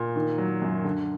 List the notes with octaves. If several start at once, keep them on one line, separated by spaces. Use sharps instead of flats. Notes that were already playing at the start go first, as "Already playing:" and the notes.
Already playing: A#2
D#3
F#3
F#2
D3